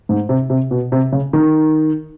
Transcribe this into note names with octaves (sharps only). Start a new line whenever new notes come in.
G#2
C3
C3
B2
C3
C#3
D#3